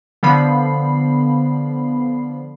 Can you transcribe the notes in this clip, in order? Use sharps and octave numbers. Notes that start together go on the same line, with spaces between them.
D3 F3 B3 B5 C7